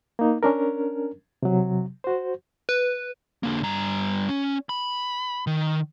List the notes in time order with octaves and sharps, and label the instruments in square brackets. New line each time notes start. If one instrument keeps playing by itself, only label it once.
[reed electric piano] A#3 D#4
C#4 D4 A#4
C3 F#3
F#4 C5
[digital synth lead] B4
[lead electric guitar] D3 A#3
G2 A#5
C#4
B5
D#3